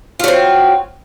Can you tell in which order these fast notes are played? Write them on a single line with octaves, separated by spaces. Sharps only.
F4 F#3 C4